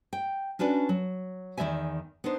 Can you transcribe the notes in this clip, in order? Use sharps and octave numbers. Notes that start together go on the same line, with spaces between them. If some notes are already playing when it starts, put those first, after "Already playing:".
G5
C#4 D4 F#4 B4 D5
F#3
E2 D#3 G#3 D5 E5 G#5
B3 D4 D#4 C5